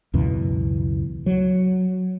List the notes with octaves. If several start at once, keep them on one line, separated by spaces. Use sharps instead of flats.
C#2 F#2 B2 E3
F#3